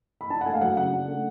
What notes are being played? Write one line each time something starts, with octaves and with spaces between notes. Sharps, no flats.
B5
D4 A5
F#5
A3 G#5
F5
F#3 F#5
C#3 F#5
D4
A3